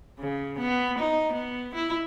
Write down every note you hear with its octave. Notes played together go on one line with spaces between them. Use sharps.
C#3
B3
D#4
B3
E4